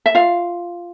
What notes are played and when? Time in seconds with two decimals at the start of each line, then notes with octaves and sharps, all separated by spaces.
0.06 E5
0.15 F4 F5